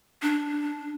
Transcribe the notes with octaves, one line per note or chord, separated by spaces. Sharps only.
D4